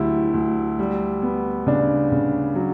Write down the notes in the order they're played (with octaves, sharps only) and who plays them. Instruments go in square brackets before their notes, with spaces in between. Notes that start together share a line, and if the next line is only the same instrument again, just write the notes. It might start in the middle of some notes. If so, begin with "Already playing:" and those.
Already playing: [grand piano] D2 D3 F#3 [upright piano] E4 G4
[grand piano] D2
G3
B3
[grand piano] C#3 [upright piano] D4
[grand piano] C#3
F#3